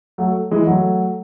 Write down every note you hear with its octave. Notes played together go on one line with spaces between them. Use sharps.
F#3 A3
E3 G#3
F#3 A3